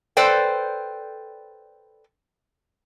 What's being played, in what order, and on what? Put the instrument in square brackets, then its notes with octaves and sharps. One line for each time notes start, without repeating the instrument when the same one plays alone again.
[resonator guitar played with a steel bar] A4 B4 C5 D5 G5